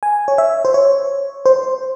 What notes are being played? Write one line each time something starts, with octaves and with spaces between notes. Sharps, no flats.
G#5
C#5
E5
C5
C#5
C5